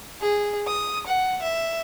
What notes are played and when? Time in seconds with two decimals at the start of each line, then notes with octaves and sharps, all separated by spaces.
0.20 G#4
0.67 D#6
1.06 F#5
1.42 E5